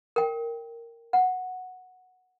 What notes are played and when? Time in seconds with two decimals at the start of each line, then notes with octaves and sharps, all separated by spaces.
0.16 A#4 G5
1.13 F#5